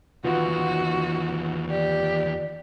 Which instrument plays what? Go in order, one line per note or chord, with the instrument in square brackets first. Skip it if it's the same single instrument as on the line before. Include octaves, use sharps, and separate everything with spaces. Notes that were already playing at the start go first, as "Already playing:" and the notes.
[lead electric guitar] E2 D#3 [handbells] F4 B4 F#5 [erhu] F#4
[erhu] G4 [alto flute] D5